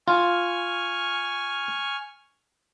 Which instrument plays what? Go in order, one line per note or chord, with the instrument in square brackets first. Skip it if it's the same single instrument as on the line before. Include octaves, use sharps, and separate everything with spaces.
[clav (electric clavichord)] F4 [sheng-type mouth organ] G#5 C#6 F6